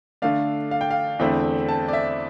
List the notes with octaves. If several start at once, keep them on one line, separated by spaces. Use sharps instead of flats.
D3 A3 D4 F5
F5
G5
F5
E2 D3 A3 C4 E4 G5
A5
D5
E5